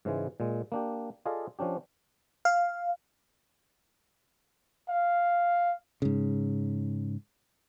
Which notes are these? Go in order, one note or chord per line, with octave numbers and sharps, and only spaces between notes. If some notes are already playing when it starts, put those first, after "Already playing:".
G#2 C#3 E3 G#3
A#2 G#3
A#3 D4 G4
F4 G#4 A4 D5 D#5 F5
F3 C#4 D4 G4
F5
F5
G#2 C#3